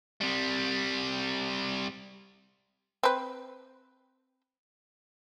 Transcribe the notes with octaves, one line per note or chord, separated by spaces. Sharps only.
C3 G3
C4 B4